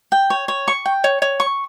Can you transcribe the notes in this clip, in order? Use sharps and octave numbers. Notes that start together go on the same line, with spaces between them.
G5
C#5
C#5
C#6
G5
C#5
C#5
C#6